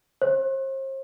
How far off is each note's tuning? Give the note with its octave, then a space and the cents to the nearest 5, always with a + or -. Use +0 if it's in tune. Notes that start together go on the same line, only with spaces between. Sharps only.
C5 +40